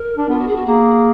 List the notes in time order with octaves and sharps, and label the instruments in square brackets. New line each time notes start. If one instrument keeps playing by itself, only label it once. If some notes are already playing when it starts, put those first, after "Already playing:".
Already playing: [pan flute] A#4
[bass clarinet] D4
[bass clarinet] B3 [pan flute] F4
[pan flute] F#4
G#4
F#4
[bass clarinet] A#3 [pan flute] G#4